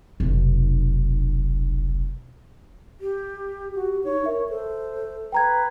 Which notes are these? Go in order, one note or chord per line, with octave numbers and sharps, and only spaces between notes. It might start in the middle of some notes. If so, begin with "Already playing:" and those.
F1 B1
G4
F#4 G4
D#4 C#5
A#4 E5
A4 C5
B4 G5 A#5 G#6